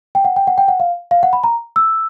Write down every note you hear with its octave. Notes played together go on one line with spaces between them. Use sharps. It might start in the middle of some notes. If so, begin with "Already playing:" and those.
G5
F#5
G5
F#5
G5
F#5
F5
F5
F#5
B5
A#5
E6